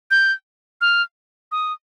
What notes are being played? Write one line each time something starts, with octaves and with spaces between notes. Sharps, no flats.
G6
F6
D#6